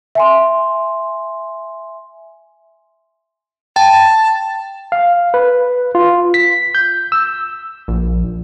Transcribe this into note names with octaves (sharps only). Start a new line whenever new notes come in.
E5 G#5 C6
G5 A5
F5
B4
F4
B6
G6
E6
A#1